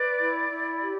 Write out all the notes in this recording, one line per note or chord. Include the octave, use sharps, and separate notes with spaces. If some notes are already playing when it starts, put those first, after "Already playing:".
Already playing: B4 D5
E4
E4
G4